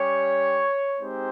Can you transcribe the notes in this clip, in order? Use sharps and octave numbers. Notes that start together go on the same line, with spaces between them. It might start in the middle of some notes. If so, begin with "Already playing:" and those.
Already playing: G3 C#4 G4 C#5
G#3 C4 D#4 G4 C5